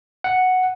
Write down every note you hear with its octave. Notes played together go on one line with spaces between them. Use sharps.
F#5